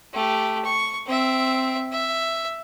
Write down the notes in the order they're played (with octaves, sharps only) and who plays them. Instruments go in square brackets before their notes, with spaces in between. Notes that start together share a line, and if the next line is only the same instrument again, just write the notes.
[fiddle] A3 G4
C#6
C4 E5
E5